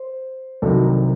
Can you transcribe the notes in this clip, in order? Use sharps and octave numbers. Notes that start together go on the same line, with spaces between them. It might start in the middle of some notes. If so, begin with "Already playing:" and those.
Already playing: C5
C2 C3 D#3 F#3 A4